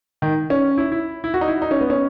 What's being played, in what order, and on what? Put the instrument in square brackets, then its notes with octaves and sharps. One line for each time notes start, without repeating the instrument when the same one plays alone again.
[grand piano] D#3
C#4
E4
E4
E4
F#4
D#4
E4
D#4
C#4
B3
C#4